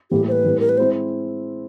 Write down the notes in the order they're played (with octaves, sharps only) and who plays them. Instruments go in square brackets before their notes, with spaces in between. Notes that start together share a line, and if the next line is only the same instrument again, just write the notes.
[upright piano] A2 E3 G3 A#3 [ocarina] G4
[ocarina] C5
B4
[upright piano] A2 E3 G3 C4
[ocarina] A#4
B4
[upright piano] G#3 C4 E4 [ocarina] C5